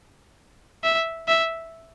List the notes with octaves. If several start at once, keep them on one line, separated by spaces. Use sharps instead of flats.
E5
E5